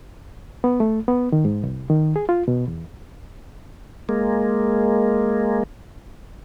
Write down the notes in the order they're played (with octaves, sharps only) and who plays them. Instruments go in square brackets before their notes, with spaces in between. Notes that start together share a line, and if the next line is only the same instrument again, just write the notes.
[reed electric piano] B3
A3
B3
D#3
G#2
C2
D#3
G#4
F4
B2
E2
[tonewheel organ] G#3 A#3